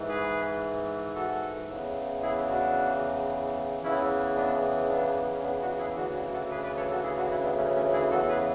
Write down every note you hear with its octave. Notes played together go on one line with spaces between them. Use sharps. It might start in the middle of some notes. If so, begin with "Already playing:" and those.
Already playing: G#2 E3
G#4 B4
F#4 A4
E2 C#3 E3
E4 G#4
D4 F#4
E2 C#3 E3 C#4 E4
B3 D4
B3 D4
C#4
B3 D4
D4 F#4
E4 G#4
D2 C#3 E3 D4 F#4
D4 F#4
F#4 A4
G#4 B4
B4 D5
A4 C#5
F#4 A4
E4 G#4
D4 F#4
C#4 E4
B3 D4
A3 C#4
A3 C#4
E4 G#4
E2 C#3 E3 F#4 A4
G#4 B4